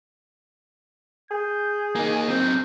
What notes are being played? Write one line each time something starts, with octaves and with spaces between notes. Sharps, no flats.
G#4 G6
A#3 D#4
F#3 C4 G6